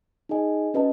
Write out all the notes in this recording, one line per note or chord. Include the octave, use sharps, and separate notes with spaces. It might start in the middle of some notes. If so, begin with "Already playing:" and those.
D#4 G#4 D#5 G#5
C#4 F#4 B4 D#5 A5